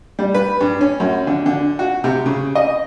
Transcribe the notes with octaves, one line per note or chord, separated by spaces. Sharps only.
G3
B4
G2
C#4
F#2
D3
D3
F#4
C3
C#3
D#5